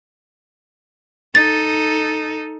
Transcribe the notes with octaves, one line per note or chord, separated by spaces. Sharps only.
D#4 A4 A6